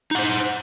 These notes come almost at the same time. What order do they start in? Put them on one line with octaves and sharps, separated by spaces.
D#4 F#5 C5